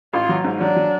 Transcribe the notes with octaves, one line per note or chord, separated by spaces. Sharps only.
A1 F4
F#3
G#2
F#3 D4
F#3